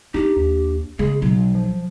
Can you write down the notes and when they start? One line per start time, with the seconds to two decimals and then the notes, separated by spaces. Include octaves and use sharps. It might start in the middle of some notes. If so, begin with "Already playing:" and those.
0.14 D4 D#4 G4
0.37 D#2
0.99 C#3 G#3 G#4
1.22 B1 F#3
1.55 F3